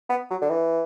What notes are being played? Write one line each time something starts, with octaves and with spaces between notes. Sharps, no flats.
B3
F#3
D3
E3